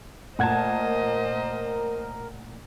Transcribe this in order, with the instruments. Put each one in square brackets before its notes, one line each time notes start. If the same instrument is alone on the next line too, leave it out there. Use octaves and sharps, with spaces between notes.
[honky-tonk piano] A#2 A5 [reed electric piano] A3 F#5 G#6 [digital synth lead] A#4 [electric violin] C5 D#5